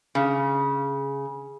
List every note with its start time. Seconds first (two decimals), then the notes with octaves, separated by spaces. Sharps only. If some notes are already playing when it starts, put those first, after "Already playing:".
0.15 C#3